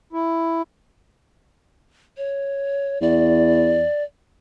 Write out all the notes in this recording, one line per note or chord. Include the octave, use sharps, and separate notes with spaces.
E4
C#5
E2 D5